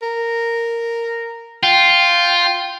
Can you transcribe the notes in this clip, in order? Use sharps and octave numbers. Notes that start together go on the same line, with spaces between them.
A#4
F4 G5